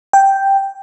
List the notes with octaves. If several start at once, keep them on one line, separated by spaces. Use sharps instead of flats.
G5